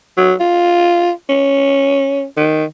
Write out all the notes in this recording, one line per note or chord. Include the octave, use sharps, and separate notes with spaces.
F#3
F4
C#4
D#3